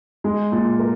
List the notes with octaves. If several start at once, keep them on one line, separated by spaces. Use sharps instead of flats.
G#3
A#2
A#4